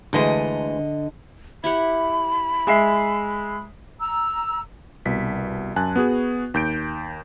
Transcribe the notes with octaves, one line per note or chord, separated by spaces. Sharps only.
D2 D3 E3 G#3 D#5
E4 G4 F#5 B5
G#3 E5 C7
A#5 E6
C2 B2 B6
F#2 G#5 A5 F#6
B3 F#4 G#4
D#2 G6 D7